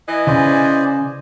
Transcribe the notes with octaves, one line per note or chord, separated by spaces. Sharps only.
E3 D#5
C#3 C5 D5 G#5